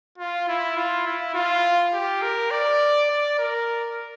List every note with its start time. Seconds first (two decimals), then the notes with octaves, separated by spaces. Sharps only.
0.18 F4
0.48 E4
0.77 F4
1.06 E4
1.34 F4
1.94 G4
2.22 A#4
2.51 D5
3.09 D5
3.38 A#4